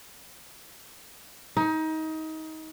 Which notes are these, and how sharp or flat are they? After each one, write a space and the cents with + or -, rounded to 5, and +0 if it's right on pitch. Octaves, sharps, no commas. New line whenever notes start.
D#4 +25